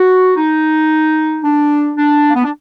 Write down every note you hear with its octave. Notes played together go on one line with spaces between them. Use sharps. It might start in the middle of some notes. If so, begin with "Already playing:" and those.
Already playing: F#4
D#4
D4
D4
A#3
B3
D4